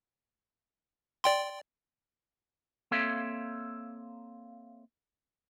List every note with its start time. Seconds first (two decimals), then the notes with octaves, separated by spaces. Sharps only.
1.24 D5 G5 C6
2.91 A#3 C4 A4 C#5 E5 F5